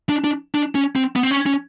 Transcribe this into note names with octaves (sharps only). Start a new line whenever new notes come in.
D4
D4
D4
C#4
C4
B3
C4
C#4
C#4